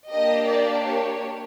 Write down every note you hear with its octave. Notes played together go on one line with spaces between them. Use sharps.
A#3 D4 G4 D#5
D5
C#5